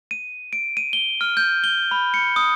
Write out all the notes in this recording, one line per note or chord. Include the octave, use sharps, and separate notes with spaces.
D#7
D7
D#7
G7
F6
G6
G7
B5
C#7
D#6